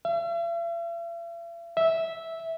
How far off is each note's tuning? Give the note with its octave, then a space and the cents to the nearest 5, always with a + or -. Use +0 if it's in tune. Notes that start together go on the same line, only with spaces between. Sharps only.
E5 +45
E5 -10